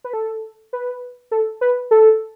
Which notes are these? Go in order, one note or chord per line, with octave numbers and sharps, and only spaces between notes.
B4
A4
B4
A4
B4
A4